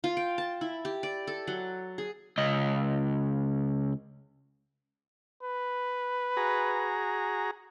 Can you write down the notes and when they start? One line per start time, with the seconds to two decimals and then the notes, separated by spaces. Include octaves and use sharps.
0.04 F4
0.17 G5
0.38 A5
0.61 E4
0.85 G4
1.03 D5
1.27 A4
1.47 F#3
1.98 G#4
2.38 C#2 D#5
5.43 B4
6.37 F#4 G#4 A#5